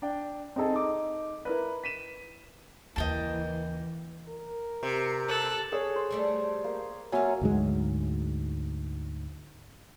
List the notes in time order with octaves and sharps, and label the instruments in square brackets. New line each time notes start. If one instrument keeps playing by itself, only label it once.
[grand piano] D4 G5
C4 D#4 G#4 A4 D#5
D#4 D6
E4 A#4 B4
B6 D#7 E7
[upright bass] D#2 C#3 [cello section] E3 [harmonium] A#3 [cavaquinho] D#5 G5 A5
[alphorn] A#4
[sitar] C3
[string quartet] A4 F#6
[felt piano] G#4 C#5 [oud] A4
[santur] C5
[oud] G3 A3 D5
[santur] A#3
[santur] F#3 [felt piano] A#3 E5 G#5 [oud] C#4 F4
[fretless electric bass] D2 G#2 F#3 G#3